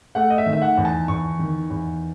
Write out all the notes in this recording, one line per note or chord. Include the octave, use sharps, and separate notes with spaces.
A3 F#5
D#5
E5
D#3
E5
F#5
E2
A5
E2 C#6
D#3
E2